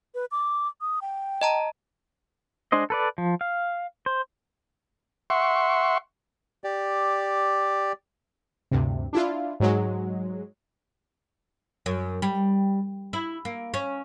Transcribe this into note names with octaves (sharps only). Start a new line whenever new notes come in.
B4
D6
D#6
G5
D#5 A5 A#5
G#3 D4 C5 D#5
A4 B4 D5
F3
F5
C5
E5 F#5 C6 C#6
G4 D5
D2 G2 C3
D4 E4 F4
G#2 F#3 G#3
F#2
G3
E4
A#3
C#4